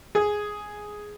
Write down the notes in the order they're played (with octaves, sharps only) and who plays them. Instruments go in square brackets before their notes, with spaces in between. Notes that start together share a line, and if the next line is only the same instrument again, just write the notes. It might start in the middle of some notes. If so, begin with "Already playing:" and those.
[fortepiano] G#4